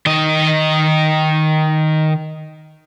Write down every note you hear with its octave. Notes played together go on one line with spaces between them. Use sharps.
D#3 D#5